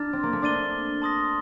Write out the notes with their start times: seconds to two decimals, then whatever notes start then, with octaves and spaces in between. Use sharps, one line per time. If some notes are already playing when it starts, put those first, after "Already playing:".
Already playing: D4 A#5 F6 A6
0.13 C4
0.23 A#3
0.33 A3
0.42 D4 D6 A6 D#7 G7
1.02 A5 C6 D#6 A#6